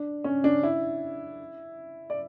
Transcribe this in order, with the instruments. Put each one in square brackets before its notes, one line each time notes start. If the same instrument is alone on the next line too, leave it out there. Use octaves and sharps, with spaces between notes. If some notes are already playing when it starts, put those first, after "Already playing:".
Already playing: [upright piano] D4
C#4
D4
E4
D5